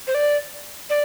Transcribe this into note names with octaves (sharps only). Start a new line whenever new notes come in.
C5
D5
D5